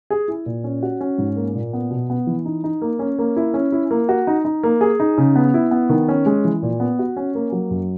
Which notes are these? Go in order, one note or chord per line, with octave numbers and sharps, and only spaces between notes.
G#4
E4
A#2
C#4
F#4
C#4
G#2
A#3
A#2
B3
B2
B3
E3
D#4
D#4
A#3
C#4
A#3
E4
C#4
E4
A#3
F#4
D#4
D#4
A#3
G#4
D#4
C#3
B3
E4
B3
D#3
C#4
G#3
E3
A#2
B3
F#4
C#4
A#3
F#3
F#2